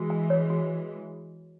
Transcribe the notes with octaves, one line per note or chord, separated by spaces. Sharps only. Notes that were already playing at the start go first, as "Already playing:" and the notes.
Already playing: E3 G#3 F#4
G#5
C#5
F#4